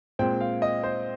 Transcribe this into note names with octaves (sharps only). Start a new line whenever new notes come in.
A#2 G#3 C4 G5
F5
D#5
C5